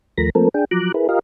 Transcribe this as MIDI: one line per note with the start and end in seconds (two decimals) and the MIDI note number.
0.18 0.30 39
0.18 0.30 53
0.18 0.30 57
0.18 0.30 70
0.18 0.30 83
0.18 0.30 94
0.35 0.49 53
0.35 0.49 57
0.35 0.49 58
0.35 0.49 60
0.35 0.49 69
0.35 0.49 70
0.54 0.65 62
0.54 0.65 68
0.54 0.65 79
0.71 0.92 53
0.71 0.92 54
0.71 0.92 82
0.71 0.92 86
0.71 0.92 90
0.94 1.07 64
0.94 1.07 68
0.94 1.07 70
0.94 1.07 71
1.09 1.19 65
1.09 1.19 67
1.09 1.19 70
1.09 1.19 75
1.09 1.19 77